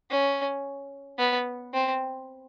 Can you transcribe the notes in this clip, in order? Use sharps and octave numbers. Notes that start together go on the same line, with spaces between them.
C#4
B3
C4